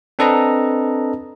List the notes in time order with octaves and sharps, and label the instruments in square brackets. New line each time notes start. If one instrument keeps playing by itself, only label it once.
[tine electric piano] C4 D4 A4 B4 D#5 A#5